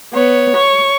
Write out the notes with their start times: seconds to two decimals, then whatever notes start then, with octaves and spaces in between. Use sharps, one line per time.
0.14 B3 C#5
0.57 C#6